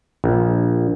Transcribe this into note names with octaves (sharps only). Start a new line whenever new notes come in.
A#1